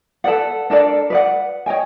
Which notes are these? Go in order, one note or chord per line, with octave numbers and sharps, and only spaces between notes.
A4 B4 D5 F#5
D4 A4 A#4 D5
B4 D5 F#5
C#5 D#5 G5 G#5